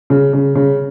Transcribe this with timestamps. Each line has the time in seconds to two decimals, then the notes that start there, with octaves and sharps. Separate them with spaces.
0.10 C#3
0.33 C#3
0.55 C#3